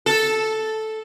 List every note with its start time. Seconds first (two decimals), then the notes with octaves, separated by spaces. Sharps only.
0.06 A4